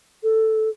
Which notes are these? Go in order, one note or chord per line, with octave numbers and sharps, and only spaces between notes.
A4